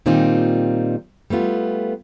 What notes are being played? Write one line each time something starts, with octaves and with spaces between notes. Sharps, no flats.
A#2 D#3 G3 C4 D#4 F4
G3 A3 B3 F4